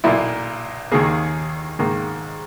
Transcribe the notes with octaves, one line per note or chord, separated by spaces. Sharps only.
B1 A#2 A#3 E4
D#2 D#3 A#3 G#4
G#2 D#3 A#3